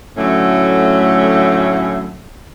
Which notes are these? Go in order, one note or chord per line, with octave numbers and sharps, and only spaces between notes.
A2 D3 F#3 A3 C#4